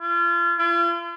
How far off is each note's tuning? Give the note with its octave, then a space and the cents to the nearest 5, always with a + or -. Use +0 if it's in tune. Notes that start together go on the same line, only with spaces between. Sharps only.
F4 -30
F4 -40